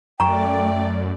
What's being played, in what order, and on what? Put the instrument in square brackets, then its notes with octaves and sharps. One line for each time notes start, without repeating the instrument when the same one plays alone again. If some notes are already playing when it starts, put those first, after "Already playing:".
[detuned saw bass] F#2 [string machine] A3 D5 [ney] G5 [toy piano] A#5 C#6